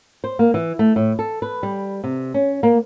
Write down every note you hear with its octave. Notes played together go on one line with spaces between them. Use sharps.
C5
A#3
E3
A3
A2
A4
B4
G3
C3
C#4
A#3